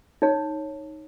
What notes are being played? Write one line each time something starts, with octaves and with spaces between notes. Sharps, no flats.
D#4 C#5